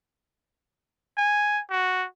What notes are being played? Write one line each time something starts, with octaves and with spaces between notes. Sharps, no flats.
G#5
F#4